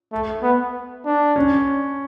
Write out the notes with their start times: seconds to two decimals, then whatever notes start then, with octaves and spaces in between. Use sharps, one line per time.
0.12 A3
0.42 B3
1.05 D4
1.36 C#4